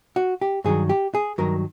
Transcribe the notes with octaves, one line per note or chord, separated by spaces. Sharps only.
F#4
G4
G2 D#3 F#3 G#4
G4
G#4
G2 D#3 F#3 A#4